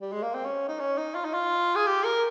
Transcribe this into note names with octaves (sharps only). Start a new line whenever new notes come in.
G3
G#3
A#3
C4
C#4
D#4
C#4
D#4
F4
D#4
F4
G#4
G4
A#4